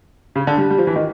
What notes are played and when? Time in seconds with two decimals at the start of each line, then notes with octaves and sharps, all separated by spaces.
0.36 C#3
0.47 D3
0.58 G3
0.71 G3
0.78 F3
0.87 E3
0.96 D#3